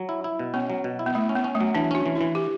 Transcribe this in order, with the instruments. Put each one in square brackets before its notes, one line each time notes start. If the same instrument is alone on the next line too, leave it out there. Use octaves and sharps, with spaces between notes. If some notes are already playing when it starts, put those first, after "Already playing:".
Already playing: [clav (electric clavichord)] F#3
E4
E4
B2
[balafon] B3 [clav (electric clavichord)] C#4
[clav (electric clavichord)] F#3
B2
E4
[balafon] B3
[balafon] A3 [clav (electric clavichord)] E4
[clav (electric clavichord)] C#4
[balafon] B3
[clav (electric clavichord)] C#4
[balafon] A3
[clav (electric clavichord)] F#3
[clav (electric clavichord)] E3 [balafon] D4
[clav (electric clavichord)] C#4 [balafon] F#4
[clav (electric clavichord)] E3
[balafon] E4
[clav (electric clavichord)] E3
[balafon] G4